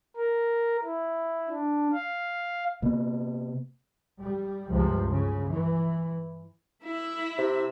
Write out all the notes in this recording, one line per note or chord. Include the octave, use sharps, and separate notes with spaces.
A#4
E4
D4
F5
C3 A#3 B3
G3
C#2 G2 C3 F3
C#3
E3
E4 E5
C3